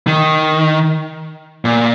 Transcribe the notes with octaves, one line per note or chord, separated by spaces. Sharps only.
D#3
A#2